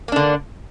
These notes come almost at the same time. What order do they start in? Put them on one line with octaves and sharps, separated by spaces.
A#3 D4 D3